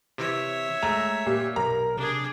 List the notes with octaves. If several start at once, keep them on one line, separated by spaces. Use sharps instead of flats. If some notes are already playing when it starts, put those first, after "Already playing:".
C3 E3 C#5 E5
G#3 A3 A#5 E6
A#2 G4
B1 A#4 A#5
C3 D4 G#4